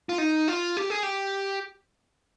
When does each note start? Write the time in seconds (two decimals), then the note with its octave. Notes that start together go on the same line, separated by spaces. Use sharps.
0.09 F4
0.18 D#4
0.48 F4
0.77 G4
0.90 G#4
1.03 G4